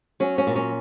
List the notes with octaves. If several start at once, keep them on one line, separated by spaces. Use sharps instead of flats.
F#3 C#4
C#4
A#2
C#4